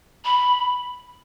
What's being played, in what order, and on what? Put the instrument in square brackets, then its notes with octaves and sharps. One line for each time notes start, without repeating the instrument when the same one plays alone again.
[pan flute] B5